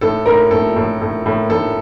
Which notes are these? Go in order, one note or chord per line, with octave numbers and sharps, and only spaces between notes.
A2 A4
A2 A#4
A2 A4
A2
A2
A2
A2 A4